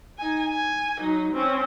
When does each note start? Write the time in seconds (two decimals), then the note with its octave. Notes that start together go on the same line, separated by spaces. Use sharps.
0.18 D#4 G#5
0.49 G#5
1.00 F#3 D#4
1.32 C4 C#4